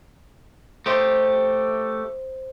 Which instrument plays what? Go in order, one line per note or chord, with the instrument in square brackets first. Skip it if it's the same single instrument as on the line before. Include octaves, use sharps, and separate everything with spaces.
[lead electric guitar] A3 G4 [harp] C5 D#5